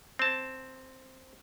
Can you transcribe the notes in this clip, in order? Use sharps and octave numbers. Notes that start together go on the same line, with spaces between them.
C4 A5